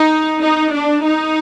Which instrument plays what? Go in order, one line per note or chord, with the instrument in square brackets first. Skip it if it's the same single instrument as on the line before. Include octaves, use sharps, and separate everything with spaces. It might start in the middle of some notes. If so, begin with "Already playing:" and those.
Already playing: [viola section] D#4
D#4
D4
D#4